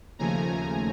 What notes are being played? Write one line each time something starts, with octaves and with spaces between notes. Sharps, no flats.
D#2 C#3 F3 A3 G#5 A#5